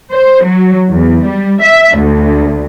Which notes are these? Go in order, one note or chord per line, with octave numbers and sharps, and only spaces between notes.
C5
F#3
E2
G3
E5
D2